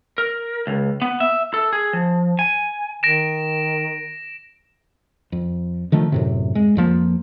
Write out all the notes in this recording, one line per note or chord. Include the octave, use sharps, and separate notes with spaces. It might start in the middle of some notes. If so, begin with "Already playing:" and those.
A#4
C#2
B3
E5
A4
G#4
F3
G#5
D#3 A#6 D7 E7
F2
D3 D#3 F3 A3
F#2 A2 C3
G#3
F2 F3 A#3